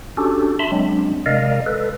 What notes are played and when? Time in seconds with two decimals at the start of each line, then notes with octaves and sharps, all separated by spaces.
0.17 C#4 D4 F#4 G4 A4
0.59 E5 A5 B5 C6
0.72 F#3 G#3 C4 D4
1.26 C3 G#3 A#4 D5 D#5 F5
1.66 A4 B4